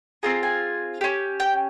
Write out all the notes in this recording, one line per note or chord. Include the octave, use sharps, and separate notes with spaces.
C4 F4 G#4 A#5
G#5
C#4 G4
G5